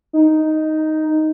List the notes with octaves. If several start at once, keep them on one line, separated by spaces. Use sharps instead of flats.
D#4